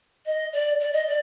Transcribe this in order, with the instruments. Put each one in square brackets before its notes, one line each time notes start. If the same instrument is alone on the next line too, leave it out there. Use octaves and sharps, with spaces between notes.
[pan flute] D#5
D5
D5
D#5
D5